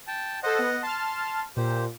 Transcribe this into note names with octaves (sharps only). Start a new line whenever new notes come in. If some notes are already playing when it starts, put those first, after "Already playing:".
G5 A5
A4 C5 D#5 F#5
B3
A5 C6 F6
A#2 G4 C5